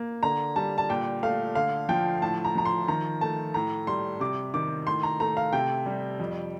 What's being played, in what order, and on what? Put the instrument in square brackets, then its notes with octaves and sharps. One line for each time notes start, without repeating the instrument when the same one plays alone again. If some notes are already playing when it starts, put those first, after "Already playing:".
Already playing: [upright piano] A#3
D3 A#5
G3 A5
A5
A#2 G5
A3 F5
D3 F5
F3 G5
A2 A5
A#5
F3 A#5
C6
D#3 A#5
A3 A5
A2 A#5
G3 C6
C3 D6
D#3 D6
A2 C6
A#5
A3 A#5
F5
C3 G5
G3
F2